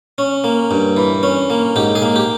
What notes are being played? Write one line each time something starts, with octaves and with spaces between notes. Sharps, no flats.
C#4
A#3
G2
E3
C#4
A#3
G#2 G4
G#4
A#3
G4